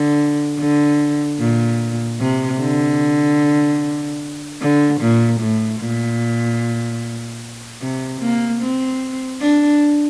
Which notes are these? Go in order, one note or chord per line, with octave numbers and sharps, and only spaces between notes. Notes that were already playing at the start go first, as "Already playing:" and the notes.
Already playing: D3
D3
A#2
C3
D3
D3
A#2
A2
A#2
C3
A#3
C4
D4